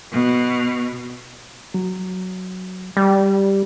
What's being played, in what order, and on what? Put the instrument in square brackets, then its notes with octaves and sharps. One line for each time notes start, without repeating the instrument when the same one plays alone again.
[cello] B2
[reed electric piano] F#3
[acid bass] G3